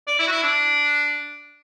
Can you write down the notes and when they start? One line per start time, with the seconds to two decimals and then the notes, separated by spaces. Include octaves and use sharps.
0.07 D5
0.19 E4
0.27 F#4
0.31 E4
0.43 D4